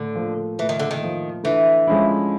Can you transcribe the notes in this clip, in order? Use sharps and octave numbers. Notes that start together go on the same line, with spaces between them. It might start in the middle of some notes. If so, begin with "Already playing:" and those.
Already playing: A2 D3
F3 A#3
A2 E3
D#3
D3
D#3
F3 A#3
D3 E3
F3 G#3 C#4 E4